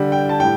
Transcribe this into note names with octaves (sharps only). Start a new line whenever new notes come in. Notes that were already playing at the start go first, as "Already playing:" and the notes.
Already playing: D3 G3
G5
A5
A2 G3 G5